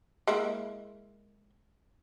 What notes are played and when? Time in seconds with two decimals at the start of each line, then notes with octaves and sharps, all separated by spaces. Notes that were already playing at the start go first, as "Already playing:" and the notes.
0.27 G#3 A#3 E4